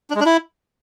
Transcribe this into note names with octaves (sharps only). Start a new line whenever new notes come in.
D4
G#3
D4
E4